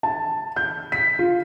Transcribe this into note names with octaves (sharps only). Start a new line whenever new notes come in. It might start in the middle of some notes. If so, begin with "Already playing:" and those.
A5
G6
B6
F4